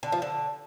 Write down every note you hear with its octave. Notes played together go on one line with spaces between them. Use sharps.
D3
F3
D3